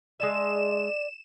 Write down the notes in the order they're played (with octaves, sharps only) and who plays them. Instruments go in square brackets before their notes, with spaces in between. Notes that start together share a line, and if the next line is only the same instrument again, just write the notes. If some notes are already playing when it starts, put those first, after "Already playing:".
[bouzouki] G#3 D4 E5 [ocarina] D5 [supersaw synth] E7